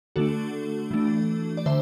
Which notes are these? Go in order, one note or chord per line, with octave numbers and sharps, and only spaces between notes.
D3 A3 D4 F#4 A4
E3 A3 D4
D5
D3 C5 E5